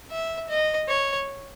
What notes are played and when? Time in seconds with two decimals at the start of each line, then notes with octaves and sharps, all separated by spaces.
0.11 E5
0.49 D#5
0.88 C#5